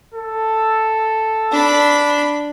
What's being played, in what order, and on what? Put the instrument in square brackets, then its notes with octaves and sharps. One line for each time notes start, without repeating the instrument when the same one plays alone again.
[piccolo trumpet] A4
[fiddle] D4 B5